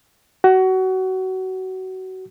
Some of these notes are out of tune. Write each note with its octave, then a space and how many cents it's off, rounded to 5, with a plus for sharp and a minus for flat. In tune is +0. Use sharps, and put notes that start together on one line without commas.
F#4 +25